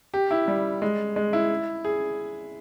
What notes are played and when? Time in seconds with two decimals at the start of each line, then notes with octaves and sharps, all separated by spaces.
0.14 G4
0.31 E4
0.48 G3
0.82 G#3
1.16 G#3
1.33 E4
1.85 G#4